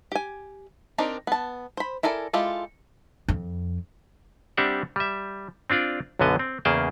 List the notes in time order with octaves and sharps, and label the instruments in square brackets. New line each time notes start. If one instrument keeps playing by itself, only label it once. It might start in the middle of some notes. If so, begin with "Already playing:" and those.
[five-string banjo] G4 G#5
C4 D4 D#4 G4 A#4
B3 A5
C5 B5
E4 A4 A#4 D5 G#5
G#3 E4 F4 G4 A4
[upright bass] F2
[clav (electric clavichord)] G3 C4 D4 G4 E5 F#5
G3 E5
C4 D4 F4 D5
B1 F#2 D3 B3 D#5
C4
E2 C#3 A#3 G#4 G5 A5